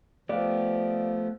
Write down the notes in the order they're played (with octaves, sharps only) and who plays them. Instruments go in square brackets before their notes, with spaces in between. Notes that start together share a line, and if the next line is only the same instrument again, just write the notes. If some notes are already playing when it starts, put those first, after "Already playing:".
[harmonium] F3 [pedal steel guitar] A3 B3 G4 [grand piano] D5 F5